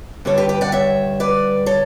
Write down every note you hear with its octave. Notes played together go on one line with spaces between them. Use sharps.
G2 D3 G3 A4 C#5
G4 B4
G4 B4
D5 F#5
C#5 E5
B4 D5
A4 C#5